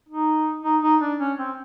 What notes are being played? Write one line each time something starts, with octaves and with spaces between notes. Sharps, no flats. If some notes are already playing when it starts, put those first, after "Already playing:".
D#4
D#4
D#4
D4
C#4
C4